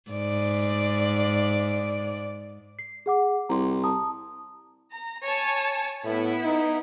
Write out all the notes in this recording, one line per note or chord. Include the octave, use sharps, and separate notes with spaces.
G#2 D5
C7
G#4 F#5 D6
C2 A#5 C6
A5 A#5 D#6
A#5
C#5 G#5 A5
A2 B3 E4
D#4